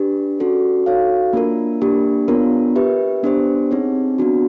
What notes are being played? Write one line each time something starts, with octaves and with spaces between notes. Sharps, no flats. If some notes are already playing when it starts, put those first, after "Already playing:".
Already playing: D4 G4 B4
C#4 F#4 A4 D5
D#4 F#4 A4 C#5 F5
A#3 D4 F4 A#4
A#3 D4 G4
B3 D4 F4 A#4 C#5
G4 B4 E5
B3 D4 G4 C5
C4 D#4 G#4 C#5
B3 D4 F#4